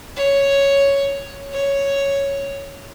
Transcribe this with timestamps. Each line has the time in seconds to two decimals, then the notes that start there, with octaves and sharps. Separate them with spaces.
0.16 C#5
1.52 C#5